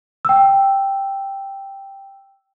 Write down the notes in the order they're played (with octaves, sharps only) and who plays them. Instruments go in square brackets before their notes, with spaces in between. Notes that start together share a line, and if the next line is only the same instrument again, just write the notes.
[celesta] G5 E6